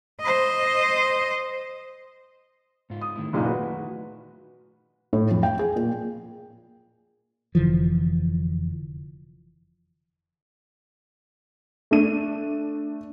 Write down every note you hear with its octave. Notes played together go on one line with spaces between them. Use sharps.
C5 D#5
G#2 F4
D#6
D#3 A3 E4
F#1 A#2 D#4
F#4 B4
A2
F2
G5
G#4
A#2
F1 D3 E3 F3
A3 D4 D#7